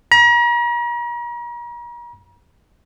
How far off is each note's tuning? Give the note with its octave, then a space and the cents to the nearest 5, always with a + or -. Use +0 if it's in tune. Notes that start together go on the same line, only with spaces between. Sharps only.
A#5 +40